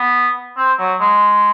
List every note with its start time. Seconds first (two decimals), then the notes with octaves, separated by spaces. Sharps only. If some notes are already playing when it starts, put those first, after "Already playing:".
Already playing: B3
0.57 C4
0.79 F#3
1.00 G#3